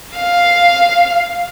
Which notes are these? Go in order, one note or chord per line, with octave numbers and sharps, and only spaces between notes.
F5